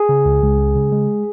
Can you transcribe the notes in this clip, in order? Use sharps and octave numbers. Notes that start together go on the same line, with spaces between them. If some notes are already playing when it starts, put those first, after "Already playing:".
Already playing: G#4
C#3
C#2
C#2
G#3
C#3
G#3